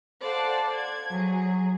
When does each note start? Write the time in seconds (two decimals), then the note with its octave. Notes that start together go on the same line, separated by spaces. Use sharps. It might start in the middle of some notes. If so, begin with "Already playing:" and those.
0.22 A4 C5 D5 F5 F#5 A5
0.74 G#6
1.11 F#3 G#4